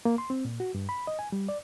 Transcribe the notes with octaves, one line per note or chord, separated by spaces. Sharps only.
A#3
C6
C4
A#2
F#4
G2
B5
D#5
G#5
G3
D5